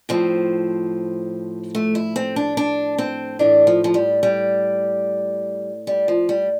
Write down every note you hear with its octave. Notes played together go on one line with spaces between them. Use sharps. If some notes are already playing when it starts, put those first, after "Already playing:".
A2 F3 C4
A3
E4
C4
D4
D4
C4
A2 E3 D4
F3
F3
G3
G3
G3
F3
G3